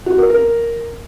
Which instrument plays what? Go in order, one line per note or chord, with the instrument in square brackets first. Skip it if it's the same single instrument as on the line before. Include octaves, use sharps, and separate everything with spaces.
[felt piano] F#4
A#4
A#4